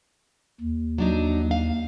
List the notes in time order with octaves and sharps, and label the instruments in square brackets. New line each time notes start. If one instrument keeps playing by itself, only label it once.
[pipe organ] D#2
[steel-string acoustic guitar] F#3 D4 D#4
F5